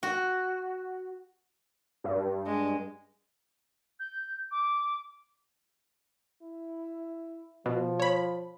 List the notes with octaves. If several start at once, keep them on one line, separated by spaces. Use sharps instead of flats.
F#4
G2
G#3
G6
D6
E4
B2 F3
C#5 B5